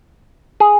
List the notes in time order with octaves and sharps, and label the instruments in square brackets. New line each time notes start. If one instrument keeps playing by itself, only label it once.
[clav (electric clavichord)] G#4